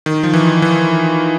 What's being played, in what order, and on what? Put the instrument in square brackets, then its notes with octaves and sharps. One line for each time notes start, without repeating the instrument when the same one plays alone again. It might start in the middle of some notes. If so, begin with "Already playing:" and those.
[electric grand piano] D#3
F3
E3
E3